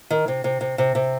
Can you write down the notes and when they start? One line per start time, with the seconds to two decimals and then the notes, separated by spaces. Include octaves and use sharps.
0.10 D#3
0.28 C3
0.44 C3
0.61 C3
0.78 C3
0.95 C3